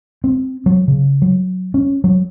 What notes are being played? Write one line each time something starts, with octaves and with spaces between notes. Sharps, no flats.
C4
F#3
C#3
F#3
C#4
F#3